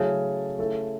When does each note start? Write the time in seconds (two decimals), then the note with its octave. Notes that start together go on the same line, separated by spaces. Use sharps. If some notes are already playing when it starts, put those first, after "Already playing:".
Already playing: C#3 F#3 A3 E4 A4
0.59 A3 E4 A4